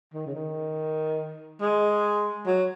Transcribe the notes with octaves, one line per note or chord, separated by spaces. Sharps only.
D#3
C#3
D#3
G#3
F#3